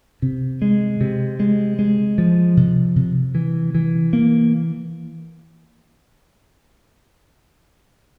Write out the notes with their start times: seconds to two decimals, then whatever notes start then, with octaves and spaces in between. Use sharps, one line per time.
0.22 C3
0.62 G#3
1.01 C3
1.40 G#3
1.79 G#3
2.18 F3
2.57 C3
2.96 C3
3.35 E3
3.75 E3
4.13 A#3